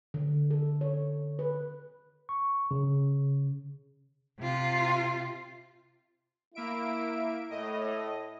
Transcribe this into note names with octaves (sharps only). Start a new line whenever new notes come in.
D3
A4
C#5
B4
C#6
C#3
C3 F4
A#3 E4 E5 D7
A2 D#5